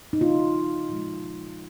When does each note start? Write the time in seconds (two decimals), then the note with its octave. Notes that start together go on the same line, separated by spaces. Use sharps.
0.13 D#4
0.21 C#3 F3 A#3 F4
0.89 A#2 F3 G#3